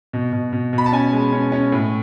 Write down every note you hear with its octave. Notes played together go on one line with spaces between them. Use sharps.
B2
B2
B2
B2
B5
A5
C#4 G#5
G#3
C#4
C#4
A2